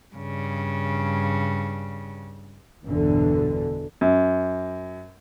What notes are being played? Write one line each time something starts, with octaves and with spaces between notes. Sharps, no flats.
G2 C#3
G1 E2 B2 D3 E3
F#2